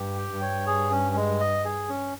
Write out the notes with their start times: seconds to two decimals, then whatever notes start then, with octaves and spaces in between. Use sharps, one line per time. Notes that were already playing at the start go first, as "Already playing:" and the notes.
Already playing: G2 G4
0.18 G5
0.30 G2
0.42 C#5
0.67 G#4
0.91 C#4
1.16 G#3
1.40 D#5
1.65 G#4
1.89 C#4